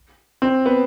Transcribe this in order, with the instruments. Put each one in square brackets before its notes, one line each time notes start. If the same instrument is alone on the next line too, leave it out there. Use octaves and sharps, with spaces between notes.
[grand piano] C4
B3